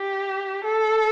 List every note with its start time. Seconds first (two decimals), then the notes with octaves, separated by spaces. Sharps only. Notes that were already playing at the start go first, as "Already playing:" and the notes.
Already playing: G4
0.64 A4